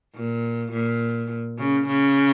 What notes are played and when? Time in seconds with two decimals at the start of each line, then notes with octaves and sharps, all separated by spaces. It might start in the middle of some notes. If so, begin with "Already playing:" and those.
0.15 A#2
0.72 A#2
1.58 C#3
1.87 C#3